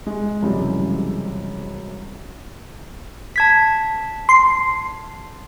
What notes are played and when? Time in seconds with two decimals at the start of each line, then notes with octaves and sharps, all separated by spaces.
0.07 G#3
0.42 C#2 F#2 C3 E3 G3 G#3
3.36 A5 G#6 B6
4.29 C6